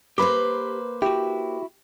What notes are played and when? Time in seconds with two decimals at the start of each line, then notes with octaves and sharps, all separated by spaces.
0.18 A#3 G4 B4 C5 B5 D6
1.02 E4 F#4 G4